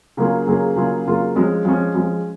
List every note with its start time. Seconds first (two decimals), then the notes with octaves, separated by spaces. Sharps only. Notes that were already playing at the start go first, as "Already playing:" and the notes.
0.17 C#3 F#3 A#3 F4 G#4
0.47 C#3 F#3 A#3 F4 G#4
0.76 C#3 F#3 A#3 F4 G#4
1.06 C#3 F#3 A#3 F4 G#4
1.35 F3 G#3 C#4
1.65 F3 G#3 C#4
1.94 F3 G#3 C#4